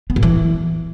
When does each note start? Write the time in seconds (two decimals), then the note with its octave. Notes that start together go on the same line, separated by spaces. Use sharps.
0.10 B3
0.16 A#2
0.23 E3